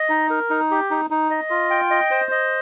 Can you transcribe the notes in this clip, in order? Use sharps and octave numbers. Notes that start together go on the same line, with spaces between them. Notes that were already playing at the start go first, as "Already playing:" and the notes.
Already playing: D#5
D#4
A#4
D#4
G4
D#4
D#4
D#5
F4
G5
D#5
C5
D#5